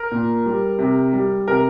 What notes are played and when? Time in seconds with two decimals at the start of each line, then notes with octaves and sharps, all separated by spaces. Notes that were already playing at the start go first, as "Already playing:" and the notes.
Already playing: A#4
0.12 A#2
0.46 G3
0.79 C3
1.13 G3
1.48 C3 A#4